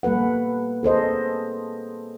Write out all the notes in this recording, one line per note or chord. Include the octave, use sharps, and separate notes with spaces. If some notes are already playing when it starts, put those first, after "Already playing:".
G3 A#3 A4 B4 F#5
G#4 A4 C5 D#5